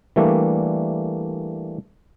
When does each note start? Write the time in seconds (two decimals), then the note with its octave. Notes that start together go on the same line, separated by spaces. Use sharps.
0.16 E3 G3 A3 A#3 D4